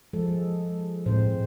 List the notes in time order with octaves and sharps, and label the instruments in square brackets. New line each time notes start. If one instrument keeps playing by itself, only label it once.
[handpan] F3 G#3 A4
[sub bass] A2 [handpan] G#3 C4 C5